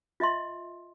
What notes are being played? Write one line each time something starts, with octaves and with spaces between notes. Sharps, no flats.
F4 D#5 E5 C6